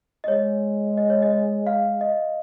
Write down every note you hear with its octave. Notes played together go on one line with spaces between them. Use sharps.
D#5
G#3 C#5
D#5
C#5
D#5
F5
D#5